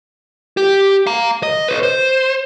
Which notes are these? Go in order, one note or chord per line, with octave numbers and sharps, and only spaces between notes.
G4
F5 A#5
D#5
B4 C#5
C5